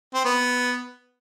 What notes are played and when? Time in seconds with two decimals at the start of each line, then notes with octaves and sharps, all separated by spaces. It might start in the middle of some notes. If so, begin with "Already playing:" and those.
0.15 C4
0.25 B3